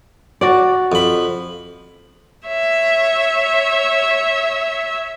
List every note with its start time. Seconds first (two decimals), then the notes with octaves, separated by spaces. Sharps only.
0.41 F#4 D5
0.92 F2 B5
2.48 C#5 E5